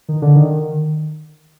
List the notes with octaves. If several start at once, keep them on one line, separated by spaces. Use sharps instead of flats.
D#3
D3
D#3